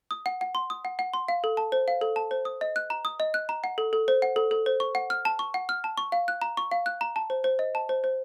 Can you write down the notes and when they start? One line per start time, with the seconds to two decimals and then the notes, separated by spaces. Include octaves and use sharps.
0.11 D#6
0.26 F#5
0.41 F#5
0.55 C6
0.70 D#6
0.85 F#5
0.99 F#5
1.14 C6
1.28 F5
1.44 A4
1.57 A5
1.72 C5
1.88 F5
2.01 A4
2.16 A5
2.31 C5
2.45 D#6
2.61 D#5
2.76 F#6
2.90 A#5
3.05 D#6
3.20 D#5
3.34 F#6
3.49 A#5
3.64 F#5
3.78 A4
3.93 A4
4.08 C5
4.22 F#5
4.36 A4
4.51 A4
4.66 C5
4.80 C#6
4.95 F#5
5.10 F6
5.25 A5
5.39 C#6
5.54 F#5
5.69 F6
5.84 A5
5.98 C#6
6.12 F5
6.28 F#6
6.42 A#5
6.57 C#6
6.71 F5
6.86 F#6
7.01 A#5
7.16 A5
7.30 C5
7.44 C5
7.59 D#5
7.75 A5
7.89 C5
8.04 C5